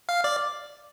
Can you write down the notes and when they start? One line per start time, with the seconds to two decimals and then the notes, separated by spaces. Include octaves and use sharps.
0.09 F5
0.24 D5